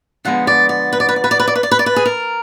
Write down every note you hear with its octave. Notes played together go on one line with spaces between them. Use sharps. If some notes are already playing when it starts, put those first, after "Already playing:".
D3 F3 G#3 B3 F#5
D5
D5
B4
D5
B4
D5
B4
D5
B4
D5
B4
D5
B4
D5
B4
G#4
A#4